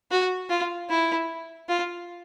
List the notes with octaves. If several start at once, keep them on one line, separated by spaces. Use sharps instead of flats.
F#4
F4
E4
F4